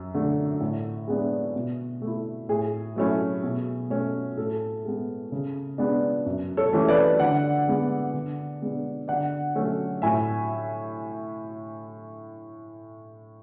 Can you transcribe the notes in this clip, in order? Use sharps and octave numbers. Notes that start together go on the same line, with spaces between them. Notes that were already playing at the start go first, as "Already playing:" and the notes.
Already playing: F#2
D3 A3
A2
G#3 B3 D4
B2
A3
E4
A2 G#4
F#3 A3 C#4 E4
B2
A3 C#4
A2 A4
G#3 B3
C#3
G#3 B3 D4
F#2
A4 C#5
E3 A3 C#4 E4
B4 D5
D3 D5 F#5
G#3 B3
D3
G#3 B3 D4
D3 D5 F#5
F#3 A3 C#4
A2 E5 G#5